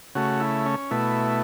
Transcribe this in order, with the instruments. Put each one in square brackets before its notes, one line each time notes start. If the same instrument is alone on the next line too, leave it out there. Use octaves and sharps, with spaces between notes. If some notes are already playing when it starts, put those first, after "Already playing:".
[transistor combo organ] C#3 A3 F#4
E4
C#4
B2 A3 E4